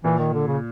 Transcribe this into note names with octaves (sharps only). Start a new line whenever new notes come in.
A#2 E3
D#3
D3
C#3